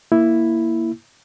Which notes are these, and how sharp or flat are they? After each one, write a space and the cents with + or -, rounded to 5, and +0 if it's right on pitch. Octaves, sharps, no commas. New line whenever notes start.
A#3 +0 E4 +0